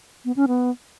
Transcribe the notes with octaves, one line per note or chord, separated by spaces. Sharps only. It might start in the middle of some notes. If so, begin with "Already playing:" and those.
B3
C#4
B3